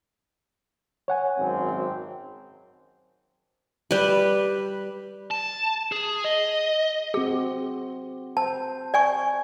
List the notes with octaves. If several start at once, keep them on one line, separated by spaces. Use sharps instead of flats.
C#5 F#5 G#5
G#1 F#2 C4
G3 B4
A5
G#4
D#5
C4 F#4 G#4
C5 A5
D5 G#5 C#6